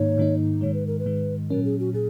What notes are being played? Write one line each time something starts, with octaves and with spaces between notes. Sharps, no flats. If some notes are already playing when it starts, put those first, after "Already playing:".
Already playing: G#2 D#3 A#3 D#4 C#5
G#2 D#3 A#3 D#4
G#2 D#3 G#3 C#5
B4
A#4
B4
G#2 D#3 G#3
A#2 F#3 C#4 A#4
G#4
F#4
A#2 G#4